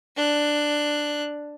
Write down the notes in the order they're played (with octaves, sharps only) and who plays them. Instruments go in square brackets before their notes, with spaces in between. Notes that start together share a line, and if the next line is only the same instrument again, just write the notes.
[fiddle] D4 F#6